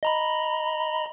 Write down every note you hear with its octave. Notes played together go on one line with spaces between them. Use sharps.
D#5 A#5 B5